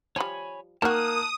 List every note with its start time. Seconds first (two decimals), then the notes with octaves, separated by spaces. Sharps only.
0.16 F3 G3 C#5 G#5 B5
0.82 D#3 A#3 F#4 A5 D#6 F6 F#6